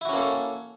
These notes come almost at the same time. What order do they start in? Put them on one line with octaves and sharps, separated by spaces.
E4 F#4 C#4 A#3 A4